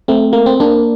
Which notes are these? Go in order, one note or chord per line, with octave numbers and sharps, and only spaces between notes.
A3 C4
A#3
C4
A#3 D4